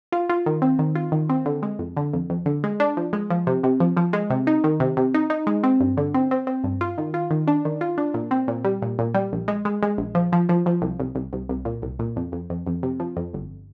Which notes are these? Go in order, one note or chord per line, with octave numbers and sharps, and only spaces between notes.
F4
F4
D#3
C4
D#3
F4
D#3
C4
D3
G#3
F2
D3
F2
F2
D3
G#3
D4
F3
G#3
F3
C3
C3
F3
F3
G#3
C3
D#4
D#3
C3
C3
D#4
D#4
G#3
C4
G2
D3
C4
C4
C4
G2
F4
D#3
F4
D#3
D4
D#3
F4
D4
A#2
C4
A#2
G3
A#2
A#2
G3
A#1
G#3
G#3
G#3
A#1
F3
F3
F3
F3
C2
C2
C2
C2
C2
A#2
C2
A#2
F2
F2
F2
F2
C3
F3
F2
G1